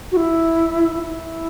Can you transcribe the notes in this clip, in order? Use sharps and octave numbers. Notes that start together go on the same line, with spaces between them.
F#4
E4
E4